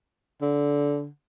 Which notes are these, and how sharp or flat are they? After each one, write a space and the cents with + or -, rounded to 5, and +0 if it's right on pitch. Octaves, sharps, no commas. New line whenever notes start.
D3 -20